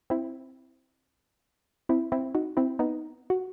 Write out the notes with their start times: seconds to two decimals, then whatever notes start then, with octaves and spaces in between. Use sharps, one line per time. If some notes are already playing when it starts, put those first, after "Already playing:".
0.10 C4 E4
1.89 C4 E4
2.12 C4 E4
2.35 D#4 F#4
2.57 C4 E4
2.79 B3 D#4
3.30 F#4